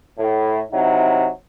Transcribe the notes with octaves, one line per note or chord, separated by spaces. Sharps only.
A2
C3 F#3 D#4 E4